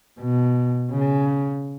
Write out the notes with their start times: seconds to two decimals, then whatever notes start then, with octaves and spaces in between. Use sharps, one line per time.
0.20 B2
0.91 C#3